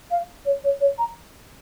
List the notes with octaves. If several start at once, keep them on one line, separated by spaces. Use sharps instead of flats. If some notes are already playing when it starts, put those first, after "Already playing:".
F5
C#5
C#5
C#5
A#5